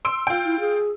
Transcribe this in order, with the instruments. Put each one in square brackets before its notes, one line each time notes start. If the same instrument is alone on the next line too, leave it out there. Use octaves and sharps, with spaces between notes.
[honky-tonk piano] C6 E6 D7
F4 G5
[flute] E4
G#4